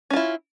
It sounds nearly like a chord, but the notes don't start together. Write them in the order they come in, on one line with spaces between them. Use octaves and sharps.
C#4 F4 E4